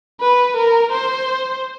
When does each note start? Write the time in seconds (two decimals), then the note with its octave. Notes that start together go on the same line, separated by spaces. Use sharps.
0.20 B4
0.56 A#4
0.92 C5